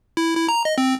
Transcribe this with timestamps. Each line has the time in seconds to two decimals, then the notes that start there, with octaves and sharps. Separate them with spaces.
0.17 E4
0.36 E4
0.49 A#5
0.65 D#5
0.78 C4